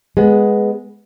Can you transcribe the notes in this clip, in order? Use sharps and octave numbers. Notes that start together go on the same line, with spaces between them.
G#3 B3